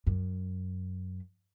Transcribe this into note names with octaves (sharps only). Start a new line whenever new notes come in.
F#2